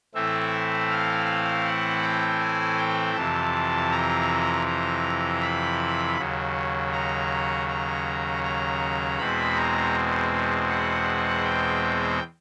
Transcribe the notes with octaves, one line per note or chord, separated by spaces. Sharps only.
A2 E3 A3 C4 E4 E5
F5
F#5
G5
G#5
G5
F2 C3 E3 A5
A#5
A#5
B5
D#2 C#3 F#3
A#5
A#5
A#5
E2 B2 G#3 C4 B5
A#5
F#5
G5